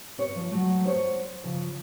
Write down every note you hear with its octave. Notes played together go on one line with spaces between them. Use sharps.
C#4 C#5
F3
F#3 A3
C5 C#5
C#3 F3